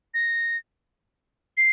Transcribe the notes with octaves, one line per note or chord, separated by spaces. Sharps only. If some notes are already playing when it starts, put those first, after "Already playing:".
A#6
C7